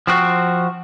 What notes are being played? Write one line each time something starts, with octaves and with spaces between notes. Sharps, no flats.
F3 C4 F#4